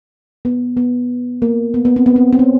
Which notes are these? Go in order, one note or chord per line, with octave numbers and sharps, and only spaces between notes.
B3
B3
A#3
B3
B3
C4
B3
C4
C4
C#4